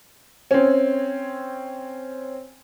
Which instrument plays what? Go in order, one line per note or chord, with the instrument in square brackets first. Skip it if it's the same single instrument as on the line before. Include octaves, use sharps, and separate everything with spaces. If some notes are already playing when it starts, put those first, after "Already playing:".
[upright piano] C4 C#4